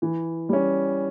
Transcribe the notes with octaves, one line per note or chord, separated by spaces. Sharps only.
E3
G3 C#4